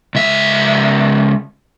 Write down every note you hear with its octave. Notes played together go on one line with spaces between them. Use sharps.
C#2 E5